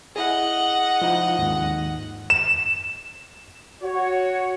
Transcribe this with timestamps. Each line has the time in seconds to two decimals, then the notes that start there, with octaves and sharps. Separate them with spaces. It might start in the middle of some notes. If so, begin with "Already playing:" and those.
0.16 E4 G#4 D#5 F#5
1.02 F3 D#4 F4
1.39 D#2 G#2 D#3
2.30 E7
3.82 F#4 C#5